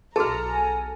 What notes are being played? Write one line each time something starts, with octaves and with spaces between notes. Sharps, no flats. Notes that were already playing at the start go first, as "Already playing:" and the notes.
B1 F#4 G#4 A4 A5 A#5 F6
G#5